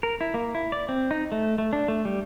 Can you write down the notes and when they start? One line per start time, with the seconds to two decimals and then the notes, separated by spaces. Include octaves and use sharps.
0.03 A#4
0.21 E4
0.34 A#3
0.55 E4
0.72 D5
0.89 C4
1.11 D#4
1.32 A3
1.58 A3
1.73 D4
1.88 A3
2.05 G3